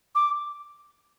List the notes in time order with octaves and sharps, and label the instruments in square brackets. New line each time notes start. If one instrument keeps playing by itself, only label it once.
[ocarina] D6